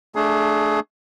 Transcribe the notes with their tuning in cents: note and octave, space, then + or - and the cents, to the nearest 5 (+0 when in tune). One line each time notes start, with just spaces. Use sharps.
A3 +0 D4 +10 G#4 +25